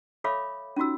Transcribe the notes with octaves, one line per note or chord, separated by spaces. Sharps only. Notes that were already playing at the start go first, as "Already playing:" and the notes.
A4 C#5 E5 F5 B5 D6
C#4 D#4 F4 F#4 E6